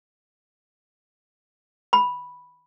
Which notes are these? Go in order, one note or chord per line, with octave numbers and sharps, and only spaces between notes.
B5